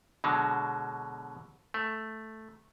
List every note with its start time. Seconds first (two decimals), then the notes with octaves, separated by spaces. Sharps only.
0.24 B2 D3 F#3 G#3
1.74 A3